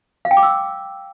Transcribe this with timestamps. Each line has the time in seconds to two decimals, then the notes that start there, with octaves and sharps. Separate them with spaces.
0.25 F5
0.31 G5
0.37 D6
0.43 E6